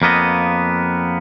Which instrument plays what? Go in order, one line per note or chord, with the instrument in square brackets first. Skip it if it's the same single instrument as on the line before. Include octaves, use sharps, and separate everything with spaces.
[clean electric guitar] F2 A#3 B3 D#5